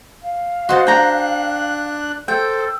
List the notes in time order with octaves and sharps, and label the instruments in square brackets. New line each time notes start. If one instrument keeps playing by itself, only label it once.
[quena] F5
[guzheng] F#4 C5 A5 [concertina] D#5 F#5 C6
[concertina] D4 F#6 [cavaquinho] G5 A#5
[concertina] A4 C5 [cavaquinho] G5 [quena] E6